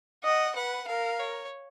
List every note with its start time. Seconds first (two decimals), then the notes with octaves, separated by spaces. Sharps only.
0.24 D#5 F#5
0.56 B4 F#5
0.88 A#4 F5
1.20 C#5